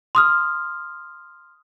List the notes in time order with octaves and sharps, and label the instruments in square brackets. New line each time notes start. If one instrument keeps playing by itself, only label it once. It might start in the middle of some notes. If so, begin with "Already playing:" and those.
[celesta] C6 D#6 F6